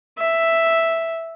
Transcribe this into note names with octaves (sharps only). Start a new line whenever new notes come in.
E5